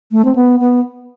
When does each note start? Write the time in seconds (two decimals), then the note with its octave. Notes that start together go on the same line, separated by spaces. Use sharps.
0.12 A3
0.25 C4
0.36 B3
0.60 B3